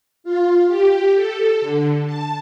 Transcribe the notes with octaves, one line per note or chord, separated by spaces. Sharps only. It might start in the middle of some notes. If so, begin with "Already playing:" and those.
F4
G4
A4
D3
A5